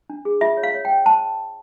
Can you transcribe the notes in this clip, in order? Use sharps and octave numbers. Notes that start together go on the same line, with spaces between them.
D4
G#4
F4 E5
C#5
F5
C#5
G5
C#5
C5 A5